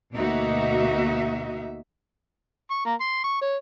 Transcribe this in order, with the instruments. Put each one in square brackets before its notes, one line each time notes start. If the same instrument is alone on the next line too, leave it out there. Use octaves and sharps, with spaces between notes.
[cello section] D2 B2 A#3 D#4 F#4 E5
[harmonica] C#6
A#3
C6
C#6
C#5